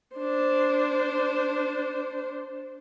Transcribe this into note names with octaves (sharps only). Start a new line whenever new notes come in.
D4 C5